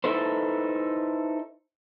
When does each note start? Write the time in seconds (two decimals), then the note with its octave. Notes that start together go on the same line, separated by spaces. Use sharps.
0.04 D#4 E4 A4 B4 C5